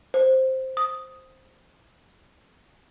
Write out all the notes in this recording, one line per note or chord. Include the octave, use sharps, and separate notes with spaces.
C5
D#6